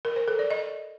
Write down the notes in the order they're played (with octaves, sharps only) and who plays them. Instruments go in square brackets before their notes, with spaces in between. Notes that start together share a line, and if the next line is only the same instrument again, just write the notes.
[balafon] A#4
C5
A4
D5
D#5